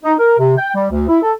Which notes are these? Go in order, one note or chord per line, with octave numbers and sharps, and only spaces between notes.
D#4
A#4
C3
G5
G3
D2
E4
A4